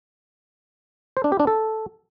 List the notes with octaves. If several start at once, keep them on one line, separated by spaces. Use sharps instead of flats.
C5
D4
G4
D4
A4